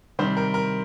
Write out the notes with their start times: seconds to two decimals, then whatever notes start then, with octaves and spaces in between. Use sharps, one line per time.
0.19 C3 D#3 G3 C4 C5
0.37 A#4
0.54 A#4